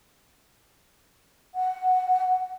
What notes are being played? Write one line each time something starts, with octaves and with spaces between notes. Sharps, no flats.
F#5